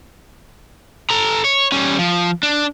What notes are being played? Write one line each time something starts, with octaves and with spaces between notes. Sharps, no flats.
A4 A#5
C#5
G3 C#4
F3
D4